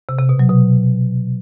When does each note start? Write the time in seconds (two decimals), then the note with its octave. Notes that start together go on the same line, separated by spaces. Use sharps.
0.09 C3
0.19 C3
0.29 B2
0.39 F#3
0.50 B2